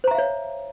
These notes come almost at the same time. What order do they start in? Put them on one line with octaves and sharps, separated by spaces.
C5 A#5 E5 F5 C#5